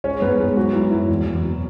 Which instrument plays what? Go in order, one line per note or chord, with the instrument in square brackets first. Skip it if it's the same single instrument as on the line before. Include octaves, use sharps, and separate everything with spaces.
[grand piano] G#3 C#4 C#5
G#2 B3 B4
G#2 G#3 G#4
F#3 F#4
F#3 E4
F#2 E4
E2
E2
B2